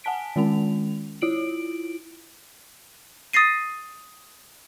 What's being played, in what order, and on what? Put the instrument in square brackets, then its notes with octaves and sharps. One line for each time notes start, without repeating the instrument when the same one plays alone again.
[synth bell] F#5 G#5 A5 B6 D7
D#3 G#3 C#4 F7
E4 F4 D7 F#7
[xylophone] D#6 A6 A#6 C7 D#7